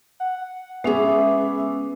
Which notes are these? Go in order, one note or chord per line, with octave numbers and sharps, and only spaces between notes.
F#5
G#3 B3 C#4 G#4 E5 D6